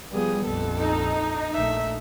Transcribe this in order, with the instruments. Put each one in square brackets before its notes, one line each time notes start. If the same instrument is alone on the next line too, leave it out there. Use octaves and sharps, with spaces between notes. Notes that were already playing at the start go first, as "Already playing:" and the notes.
[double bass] F3 G3 [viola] B3 G#4
[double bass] A#1 F2 [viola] A4
[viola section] D#4
[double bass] A#1 A3 [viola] E5